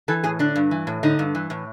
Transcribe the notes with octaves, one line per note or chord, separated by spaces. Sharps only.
E3 A4
A2 G#4
D3 D4
G2
E3
A2
D3 D#4
G2
E3
A2